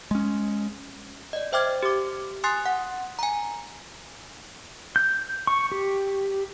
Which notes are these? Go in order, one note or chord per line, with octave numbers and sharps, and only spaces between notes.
G#3 C#4
D5 D#5
C5 E5 G5 D6 F6 G#6
G4 D6
G#5 C6 D#6 F#6 A6 C7
F#5
G#5 A#5
G6
C#6
G4